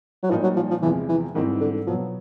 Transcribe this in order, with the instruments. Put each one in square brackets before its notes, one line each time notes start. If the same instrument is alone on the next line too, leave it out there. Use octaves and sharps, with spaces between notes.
[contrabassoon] F#3
[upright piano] A#2 G3 A#3 D#4 [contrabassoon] F3
[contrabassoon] F#3
F3
F3
[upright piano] E2 C3 F3 G#3 [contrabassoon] E3
[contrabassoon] E3
[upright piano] G#2 E3 G3 C4 [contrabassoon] D#3
[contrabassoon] D3
[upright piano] B2 F#3 B3 [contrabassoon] F3